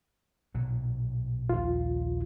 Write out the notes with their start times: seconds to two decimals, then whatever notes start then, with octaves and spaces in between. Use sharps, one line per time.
0.55 B1 A#2 F#3
1.49 A#1 D#2 F4